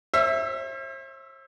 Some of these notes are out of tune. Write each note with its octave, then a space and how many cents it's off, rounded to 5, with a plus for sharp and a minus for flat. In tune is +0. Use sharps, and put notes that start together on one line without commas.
C5 +45 E5 +0 E6 +40